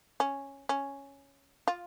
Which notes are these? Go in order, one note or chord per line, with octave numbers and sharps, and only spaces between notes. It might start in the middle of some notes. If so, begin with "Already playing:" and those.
C#4
C#4
F4